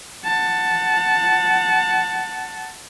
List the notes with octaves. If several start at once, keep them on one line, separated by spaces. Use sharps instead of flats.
F#5 A5